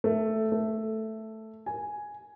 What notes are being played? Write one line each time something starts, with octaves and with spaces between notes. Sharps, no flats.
A3
A3
G#5